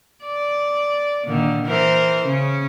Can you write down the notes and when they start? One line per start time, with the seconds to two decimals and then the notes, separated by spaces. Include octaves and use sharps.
0.24 D5
1.25 A#2 D3 D#3
1.65 E3 A#4 C5
2.26 C#3 C#4